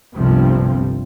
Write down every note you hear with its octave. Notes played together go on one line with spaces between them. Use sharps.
G1 C2 G2 C3 F3 C4